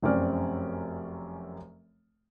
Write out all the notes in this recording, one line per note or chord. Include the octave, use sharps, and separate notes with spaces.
F1 F#2 C4 C#4 D5 F6